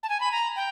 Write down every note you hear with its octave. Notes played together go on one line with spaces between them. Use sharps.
A5
G#5
B5
A#5
G5